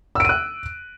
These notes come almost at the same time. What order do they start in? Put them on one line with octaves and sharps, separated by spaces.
E6 D7 D#7 F#6